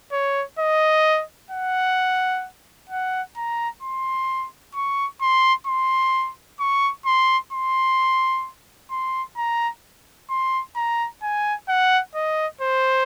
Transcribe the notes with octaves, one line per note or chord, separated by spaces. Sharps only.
C#5
D#5
F#5
F#5
A#5
C6
C#6
C6
C6
C#6
C6
C6
C6
A#5
C6
A#5
G#5
F#5
D#5
C5